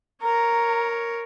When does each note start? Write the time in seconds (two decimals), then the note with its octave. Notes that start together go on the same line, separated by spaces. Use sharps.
0.22 A#4 C#5 A#5